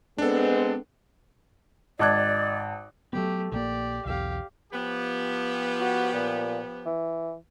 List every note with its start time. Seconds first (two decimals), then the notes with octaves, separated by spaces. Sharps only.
0.18 G#3 B3 C4 D4 A4
1.99 G#1 D5 D#5 A5 D6 F#6 G#6
3.13 F#3 G3 A3 B3 G4
3.52 A#1 E3 A#3 G4 D5
4.06 B1 E2 G4 F5
4.73 F3 B3 G4
5.80 F#4
6.14 A#2
6.86 E3